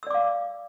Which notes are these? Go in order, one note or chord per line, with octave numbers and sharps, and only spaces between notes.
D5 F5 D6 E6